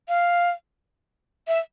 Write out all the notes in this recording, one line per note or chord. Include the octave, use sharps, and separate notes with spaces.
F5
E5